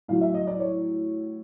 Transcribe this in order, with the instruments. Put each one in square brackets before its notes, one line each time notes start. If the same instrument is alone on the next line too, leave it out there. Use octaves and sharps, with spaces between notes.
[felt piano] A2 F#3 F5
E5
D#5
D5
C#5